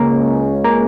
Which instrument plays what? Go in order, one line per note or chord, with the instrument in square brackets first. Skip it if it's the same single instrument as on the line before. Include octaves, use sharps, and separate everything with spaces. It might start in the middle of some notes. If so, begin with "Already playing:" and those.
Already playing: [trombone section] C#2 C#3 G#3 C#4 [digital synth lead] A#3
[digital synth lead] A#3